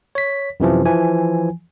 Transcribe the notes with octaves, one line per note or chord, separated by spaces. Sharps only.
C#5 B6
F#2 C3 E3 F3
E3 F3 G#5